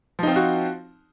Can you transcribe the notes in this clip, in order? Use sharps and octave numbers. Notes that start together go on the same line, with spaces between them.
F3 C4 D#4 F4 F#4